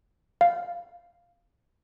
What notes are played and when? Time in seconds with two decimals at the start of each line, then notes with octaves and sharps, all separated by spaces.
0.41 F5